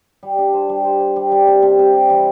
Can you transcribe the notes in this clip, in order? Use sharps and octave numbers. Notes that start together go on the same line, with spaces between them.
G3
D4
C5
G3
C5
C5
G3
G3
C3
C3
C3
G3
E3